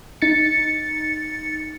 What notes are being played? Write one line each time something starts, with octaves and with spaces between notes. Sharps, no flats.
D#4 A6 C#7